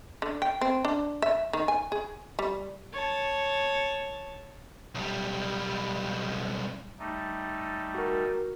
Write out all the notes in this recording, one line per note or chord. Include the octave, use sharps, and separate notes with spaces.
D3
G5
C4
D4
E5
D#3
G#5
G#4
G3
C#5 A5
B1 G3
G3 A3 D#4
F#4 A#4